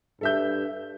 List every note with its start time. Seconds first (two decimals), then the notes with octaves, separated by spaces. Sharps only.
0.21 G2 A4 E5 G6